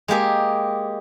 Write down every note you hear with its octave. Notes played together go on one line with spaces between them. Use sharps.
G#3 A#3 G4 G#4